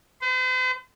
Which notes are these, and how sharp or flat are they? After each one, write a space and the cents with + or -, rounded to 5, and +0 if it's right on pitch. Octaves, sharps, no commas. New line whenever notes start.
C5 -45